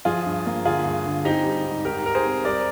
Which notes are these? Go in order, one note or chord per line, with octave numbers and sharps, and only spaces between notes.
F3 F4 G#4
G2
A#3
D3 F4 G#4
G2
D3
C4 D#4 G4
G3
G#2
G#2 G4 A#4
G#2 A#4
G#4 C5
C4
G3 A#4 D5